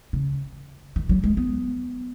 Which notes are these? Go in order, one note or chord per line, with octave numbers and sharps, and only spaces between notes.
C#3
D#3
F#3
G#3
B3